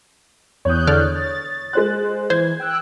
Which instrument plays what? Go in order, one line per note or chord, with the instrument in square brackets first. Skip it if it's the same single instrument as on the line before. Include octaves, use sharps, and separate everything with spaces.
[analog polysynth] E2 F#6 G6 [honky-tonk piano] C#5 D#6
[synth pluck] D3 D5 F6
[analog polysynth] A6
[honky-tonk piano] G#3 C5 F#6
[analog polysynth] E3 [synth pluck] C5 [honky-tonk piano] G#6
[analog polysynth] G5 E6 F#6